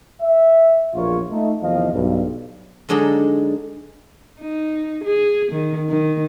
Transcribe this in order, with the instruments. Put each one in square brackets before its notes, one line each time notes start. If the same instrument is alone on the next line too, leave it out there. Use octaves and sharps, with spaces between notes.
[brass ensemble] E5
A#1 E2 B2 F4 A#4 C#5
A3 D#4
E2 C3 D#3 F3 D#5 F5
B1 G2
[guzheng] D3 F#3 G#3 D4 D#4 A4
[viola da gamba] D#4
G#4
D#3
D#3